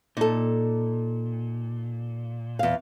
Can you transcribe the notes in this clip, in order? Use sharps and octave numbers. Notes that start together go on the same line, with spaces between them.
A#2 D#4 A4
E2 F5